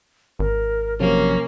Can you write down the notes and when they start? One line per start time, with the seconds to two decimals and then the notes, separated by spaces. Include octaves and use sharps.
0.39 G#1 A#4
1.00 C3 F3 F#3 A#3 C#4